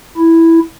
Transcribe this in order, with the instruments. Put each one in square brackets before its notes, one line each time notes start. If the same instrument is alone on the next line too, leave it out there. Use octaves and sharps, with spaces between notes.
[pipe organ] E4